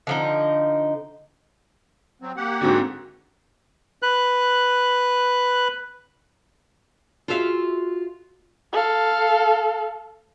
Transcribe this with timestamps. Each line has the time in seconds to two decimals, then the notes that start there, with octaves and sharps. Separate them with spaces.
0.07 D3 F3 D#4
2.22 F#3 C4
2.37 A#3 G4 F#5
2.61 G#2 D3 C4 F#4
4.03 B4 F#6
7.28 F4 F#4 G#4 E5 F5
8.73 A4 F5